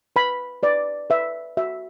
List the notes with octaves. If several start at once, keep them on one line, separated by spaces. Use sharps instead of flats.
B4 B5
B4 D5
B4 E5
F#4 E5